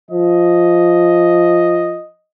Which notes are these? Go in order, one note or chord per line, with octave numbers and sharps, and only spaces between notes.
F3 D#5